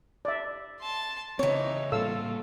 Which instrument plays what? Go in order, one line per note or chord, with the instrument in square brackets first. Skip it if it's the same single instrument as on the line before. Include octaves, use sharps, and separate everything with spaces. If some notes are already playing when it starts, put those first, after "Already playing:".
[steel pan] D5 E5
[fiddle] A5 C6
[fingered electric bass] C#3 C4 [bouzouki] E3 C#5 [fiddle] D#4
[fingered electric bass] A2 G3 A#3 [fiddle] F4 [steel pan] A4 F5 E6